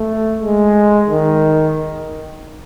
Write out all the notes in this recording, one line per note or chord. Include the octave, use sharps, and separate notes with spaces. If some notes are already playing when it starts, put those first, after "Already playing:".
Already playing: A3
G#3
D#3